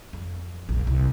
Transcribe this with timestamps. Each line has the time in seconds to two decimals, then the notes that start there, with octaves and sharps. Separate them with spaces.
0.13 F2
0.69 A#1
0.87 C2